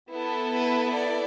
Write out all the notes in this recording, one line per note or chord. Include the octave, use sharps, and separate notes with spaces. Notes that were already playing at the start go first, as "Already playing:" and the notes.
B3 E4 A4
B4
D5